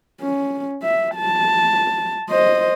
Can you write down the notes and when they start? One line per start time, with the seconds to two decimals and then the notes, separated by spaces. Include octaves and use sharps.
0.21 C#4
0.83 E5
1.16 A5
2.30 C5 D#5